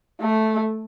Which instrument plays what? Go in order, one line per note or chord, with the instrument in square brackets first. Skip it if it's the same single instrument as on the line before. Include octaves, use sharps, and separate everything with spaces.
[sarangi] A3